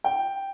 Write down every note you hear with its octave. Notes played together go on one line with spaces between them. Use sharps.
G5